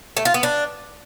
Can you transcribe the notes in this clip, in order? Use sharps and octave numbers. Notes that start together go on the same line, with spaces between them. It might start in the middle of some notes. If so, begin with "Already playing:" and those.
A3
F4
B3
D4